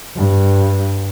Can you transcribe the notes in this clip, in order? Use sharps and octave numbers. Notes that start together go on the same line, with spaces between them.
G2